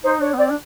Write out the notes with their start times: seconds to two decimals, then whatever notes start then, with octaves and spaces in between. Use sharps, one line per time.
0.04 D#4 C5
0.21 D4 C#5
0.34 B3
0.38 C4 D5
0.50 D4